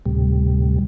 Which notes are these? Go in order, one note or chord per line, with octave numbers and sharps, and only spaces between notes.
D2 A2 C3 G3